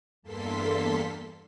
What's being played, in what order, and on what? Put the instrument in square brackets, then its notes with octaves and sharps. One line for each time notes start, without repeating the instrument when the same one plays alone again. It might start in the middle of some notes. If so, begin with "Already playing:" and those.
[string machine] E2 G2 A#3 A4 C6 B6